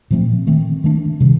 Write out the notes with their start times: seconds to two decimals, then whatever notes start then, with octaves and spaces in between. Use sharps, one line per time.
0.11 A#2 F3 A3 C4
0.47 D#3 A3 C4
0.84 D#3 A3 D4
1.20 C3 D#3 G3